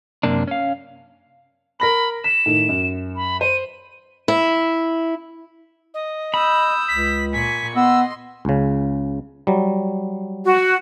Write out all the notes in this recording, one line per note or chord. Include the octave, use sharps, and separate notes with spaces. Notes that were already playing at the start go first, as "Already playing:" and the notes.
F#2 C3 A#3 D4
C#4 F5
A#4 B5 A#6 F#7
B6 E7
A2 D#3
F#2
B5
C5 D#7
E4
D#5
B5 D#6 E6 G6
C#2 B6
A#2 G#5 C#6 B6
B3 D#5 C6 E6
C#2 C#3
F#3 G3
F#4